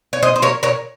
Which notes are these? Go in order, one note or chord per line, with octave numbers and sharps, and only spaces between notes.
C#5
C5 D#5
C5
A#4 C#5
A#4 C#5